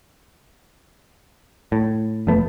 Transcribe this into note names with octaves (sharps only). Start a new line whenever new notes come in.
A2
E1 F2 A3 B3